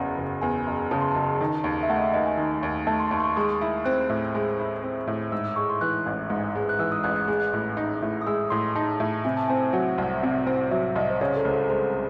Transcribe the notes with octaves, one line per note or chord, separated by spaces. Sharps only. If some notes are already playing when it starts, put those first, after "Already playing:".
Already playing: F#1 E2 C#3 F#5
F#1
E2 G#5
F#1
C#3 A5
C6
F#1 A5
D#3
D#2
E5
A3 F#5
D#5
E5
D#2 D#5
G#5
D#3
D#2
A3 A5
C6
D#2 C#6
C6
C#6
G#3 D#6
E4
C4 F#6
A2
G#3
E4
C4
A2
G#2 E6
E6
G#3 C#6
C6
E3 F#6
A1
G#2
G#3
F#6
E3 E6
D#6
A1 F#6
F#6
G#3
F#6
A2
D#4
A2
D#6
G#3 E6
A2 C6
D#4 A5
A2
C3 G#5
A5
C4 G#5
F#3 F#5
C2
C3
C4
F#3 E5
C2 D#5
C5
C#3 C#5
A4
C#2 C5
A4
G#3 C5